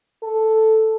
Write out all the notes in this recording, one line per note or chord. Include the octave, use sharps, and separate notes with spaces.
A4